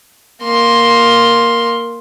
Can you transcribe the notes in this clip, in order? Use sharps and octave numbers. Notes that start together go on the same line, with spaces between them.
A#3 C6